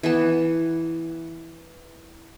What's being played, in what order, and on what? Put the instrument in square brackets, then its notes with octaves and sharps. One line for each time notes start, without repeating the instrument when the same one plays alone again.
[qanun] E3 B3 A5